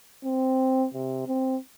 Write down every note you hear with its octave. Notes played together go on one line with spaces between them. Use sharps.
C4
C3
C4